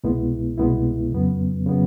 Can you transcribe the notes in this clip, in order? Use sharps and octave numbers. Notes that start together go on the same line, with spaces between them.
C2 B2 G#3 B3 E4
C2 B2 G#3 B3 E4
F2 C#3 F#3 B3
C#3 F#3 B3